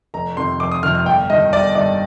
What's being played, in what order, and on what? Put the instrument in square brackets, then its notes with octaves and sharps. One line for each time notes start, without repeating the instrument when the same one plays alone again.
[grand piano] F1 A#5
F2 C3 D#3 C6
F1 D6
D#6
F2 C3 D#3 F6
F6
G1 G5
G2 D#5
D#3
G1 D5
G2 D#3 D5